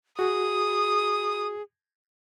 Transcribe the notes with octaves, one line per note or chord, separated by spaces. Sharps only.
F#4 G#4 D#6